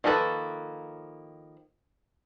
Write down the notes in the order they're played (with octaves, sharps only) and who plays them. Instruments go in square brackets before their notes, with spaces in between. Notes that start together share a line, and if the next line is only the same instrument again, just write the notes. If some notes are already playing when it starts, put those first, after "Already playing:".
[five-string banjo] D#3 F3 A#3 A4 B4